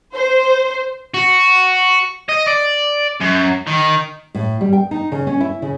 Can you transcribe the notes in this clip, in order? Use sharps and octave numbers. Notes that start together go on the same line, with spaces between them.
C5
F#4
D#5
D5
F#2
D#3
A2
G3
G5
D#4
C#3
C#4
E4
C#3